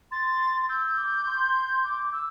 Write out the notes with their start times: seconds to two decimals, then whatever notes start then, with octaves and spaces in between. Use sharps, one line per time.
0.11 C6 A6
0.69 E6 G6
0.98 D6
1.27 C6
1.84 D6
2.13 E6